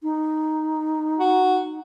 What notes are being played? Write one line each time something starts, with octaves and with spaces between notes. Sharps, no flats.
D#4
F#4